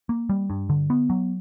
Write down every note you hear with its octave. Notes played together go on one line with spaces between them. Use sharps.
A#3
G3
G2
D3
B3
F#3